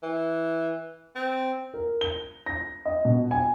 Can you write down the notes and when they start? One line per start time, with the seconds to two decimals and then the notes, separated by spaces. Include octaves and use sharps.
0.03 E3
1.15 C4
1.74 A#4
2.01 G7
2.46 A#6
2.85 D#5
3.05 B2
3.31 G#5